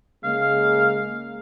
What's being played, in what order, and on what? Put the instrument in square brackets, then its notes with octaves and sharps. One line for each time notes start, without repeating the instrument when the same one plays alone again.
[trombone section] C#3 G#3 A#3 [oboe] F5